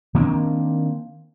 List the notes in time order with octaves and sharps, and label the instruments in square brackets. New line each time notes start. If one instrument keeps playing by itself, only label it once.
[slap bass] D#3 A#3 C4 D4